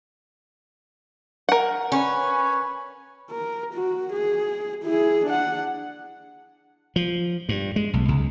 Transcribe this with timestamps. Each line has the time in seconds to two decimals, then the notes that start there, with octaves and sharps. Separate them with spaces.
1.49 A#4 F#5
1.92 C#4 B4 C#5
3.31 A#4
3.74 F#4
4.13 G#4
4.84 E4 G#4
5.25 D4 F#5
6.96 F3
7.49 G2
7.76 G#3
7.93 B1
8.08 C#2